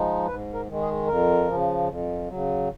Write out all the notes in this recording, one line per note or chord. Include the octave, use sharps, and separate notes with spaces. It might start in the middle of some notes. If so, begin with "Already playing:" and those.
Already playing: F3 G#3 D#4
G#2 B4
A#4
D#3 G#3
G#4
F2 A#4
C#3 F3
F2
C#3 F#3